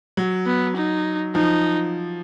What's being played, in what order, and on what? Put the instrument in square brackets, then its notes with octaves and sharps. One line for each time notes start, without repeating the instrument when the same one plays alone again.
[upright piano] F#3
[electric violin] B3
D#4
[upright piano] F3 [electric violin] D#4